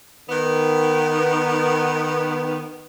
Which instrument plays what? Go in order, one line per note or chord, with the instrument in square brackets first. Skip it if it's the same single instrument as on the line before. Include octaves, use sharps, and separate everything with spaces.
[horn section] D#3 B3